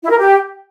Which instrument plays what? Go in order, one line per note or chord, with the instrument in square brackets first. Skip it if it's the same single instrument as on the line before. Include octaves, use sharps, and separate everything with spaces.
[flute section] E4
A#4
G4